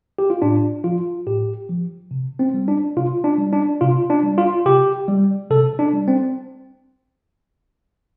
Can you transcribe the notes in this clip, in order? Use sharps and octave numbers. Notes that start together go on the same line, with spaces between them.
G4
F4
A2 D4
F3 F4
A2 G4
F3
C3
C4
G3
D4
C3 F4
D4
G3
D4
C3 F4
D4
G3
F4
C3 G4
G3
C3 A4
D4
G3
C4